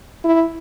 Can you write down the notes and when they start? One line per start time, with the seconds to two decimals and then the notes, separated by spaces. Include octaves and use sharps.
0.24 E4